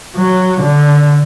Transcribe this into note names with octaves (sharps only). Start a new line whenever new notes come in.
F#3
D3